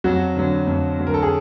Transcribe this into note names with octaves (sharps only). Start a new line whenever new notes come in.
F2 F#3 F#4
D3 F#3
F2
D3 F#3
A#4
A4
G#4